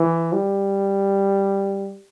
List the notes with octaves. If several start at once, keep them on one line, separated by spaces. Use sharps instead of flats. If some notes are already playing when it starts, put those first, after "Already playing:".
Already playing: E3
G3